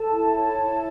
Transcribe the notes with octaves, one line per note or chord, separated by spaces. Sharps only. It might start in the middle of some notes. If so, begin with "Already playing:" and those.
Already playing: A4 A5
E4
C#5
E4